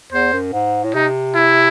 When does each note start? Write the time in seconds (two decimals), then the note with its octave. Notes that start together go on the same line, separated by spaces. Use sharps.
0.12 E2 C5
0.33 F#2
0.53 G#2
0.84 A2
0.94 C3 D#4
1.35 E4